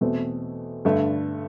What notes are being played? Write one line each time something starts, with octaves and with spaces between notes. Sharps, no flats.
E2 B2 A3 C4
G2 D3 A3